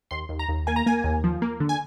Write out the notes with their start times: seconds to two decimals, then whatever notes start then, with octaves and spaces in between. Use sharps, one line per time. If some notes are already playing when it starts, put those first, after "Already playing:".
0.11 D#2 C6
0.29 D#2
0.39 A#5
0.49 D#2
0.67 A#3 G#5
0.76 A#5
0.86 A#3 G#5
1.04 D#2
1.24 F3
1.42 A#3
1.60 D3
1.69 G#5